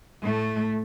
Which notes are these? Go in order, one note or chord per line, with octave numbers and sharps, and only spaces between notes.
A2 A3